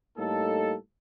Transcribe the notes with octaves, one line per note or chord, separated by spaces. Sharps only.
A2 G3 A#3 D#4 A4